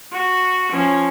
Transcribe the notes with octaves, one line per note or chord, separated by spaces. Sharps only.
F#4
F3 C#4